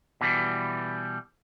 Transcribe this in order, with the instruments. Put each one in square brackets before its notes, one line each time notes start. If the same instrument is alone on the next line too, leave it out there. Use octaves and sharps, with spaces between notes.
[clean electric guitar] B2 E3 G3